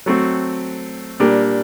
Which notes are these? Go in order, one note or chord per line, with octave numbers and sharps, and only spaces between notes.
F#3 A3 C4 F#4
A#2 G3 D4 G4 A#4